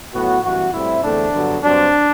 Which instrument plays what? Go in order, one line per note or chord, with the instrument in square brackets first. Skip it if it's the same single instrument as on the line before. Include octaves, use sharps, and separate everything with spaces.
[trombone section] A2 F#3 B3 F#4
F#2 E3 G3 B3 F#4
A2 G3 C4 E4
E2 D3 A3 C4 D4
G2 D3 F#3 B3
G2 F#3 C4 D4